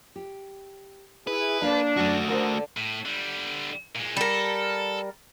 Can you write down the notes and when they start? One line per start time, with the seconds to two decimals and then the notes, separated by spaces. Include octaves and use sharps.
0.16 G4
1.27 E4 G#4 B4
1.62 A#3 D4 A4 F5
1.97 F#2 A3 F#4
2.29 D3 D4 A#4 C5
2.77 A2
3.05 D3 G3
3.95 A#2 G#3
4.17 G3 A4 A#4